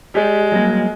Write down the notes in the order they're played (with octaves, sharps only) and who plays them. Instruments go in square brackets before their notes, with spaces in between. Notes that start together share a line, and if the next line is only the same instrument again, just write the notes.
[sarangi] G#3 [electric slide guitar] G4 C#5 D5
[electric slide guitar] F#3 G3 A#3